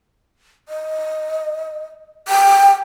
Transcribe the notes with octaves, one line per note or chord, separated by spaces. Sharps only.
D#5
G5